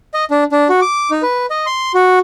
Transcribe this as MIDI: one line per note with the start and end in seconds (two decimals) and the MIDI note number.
0.14 0.25 75
0.31 0.44 62
0.52 0.68 62
0.69 0.80 66
0.81 1.10 86
1.11 1.22 63
1.23 1.46 71
1.50 1.66 75
1.66 1.92 84
1.94 2.19 66